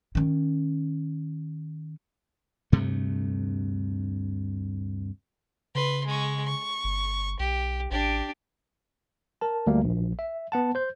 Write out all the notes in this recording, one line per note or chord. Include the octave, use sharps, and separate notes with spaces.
D#3 C#4
D2 G2 C3 A3
C#3 B4 C6
G#3 C#6
C#6
G1
B1 G4
A1 D4 G4
A#4 A5
D2 G3 A3 A#3
A#1
E5
B3 F#5 A5
C5 G6